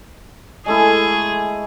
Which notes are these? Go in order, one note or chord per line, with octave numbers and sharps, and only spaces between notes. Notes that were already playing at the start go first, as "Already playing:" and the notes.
G#3 A3 E4 G#4